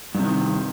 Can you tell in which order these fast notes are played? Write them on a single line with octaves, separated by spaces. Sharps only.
G2 C3 D#3